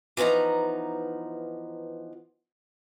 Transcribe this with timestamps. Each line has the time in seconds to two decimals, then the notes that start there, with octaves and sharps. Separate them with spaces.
0.17 E3 F3 B3 D#4 A#5